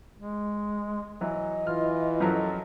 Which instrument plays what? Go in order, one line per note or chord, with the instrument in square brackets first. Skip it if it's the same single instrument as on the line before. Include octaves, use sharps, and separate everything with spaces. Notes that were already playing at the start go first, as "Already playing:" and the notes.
[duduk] G#3
[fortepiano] E3 F#3 [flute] D#5
[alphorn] E3 [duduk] F4 [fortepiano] F6
[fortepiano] F#2 F3 F#3 [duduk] A4